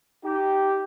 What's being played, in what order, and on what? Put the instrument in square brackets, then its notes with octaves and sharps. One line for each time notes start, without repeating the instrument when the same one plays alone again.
[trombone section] D#4 G4